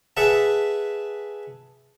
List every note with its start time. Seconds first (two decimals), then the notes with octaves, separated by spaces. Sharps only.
0.17 G#4 B4 E5 F#5 A5